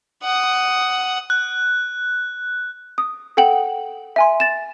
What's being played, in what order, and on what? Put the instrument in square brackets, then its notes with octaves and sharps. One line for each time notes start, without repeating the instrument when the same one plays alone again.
[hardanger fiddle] F#5 D#6
[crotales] F#6
[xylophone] D#6
A4 F#5 G5 F#7
E5 G#5 C6
A6 E7